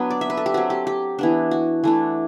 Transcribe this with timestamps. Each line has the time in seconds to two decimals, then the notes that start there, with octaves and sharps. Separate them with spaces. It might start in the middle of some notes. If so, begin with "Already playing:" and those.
Already playing: F#3 B3 D4
0.10 D5
0.21 E5
0.30 B4
0.37 A4
0.46 G4
0.54 F#3 C4 F#4
0.70 G4
0.87 G4
1.19 E3 B3 D4
1.51 F#4
1.84 E3 A3 D4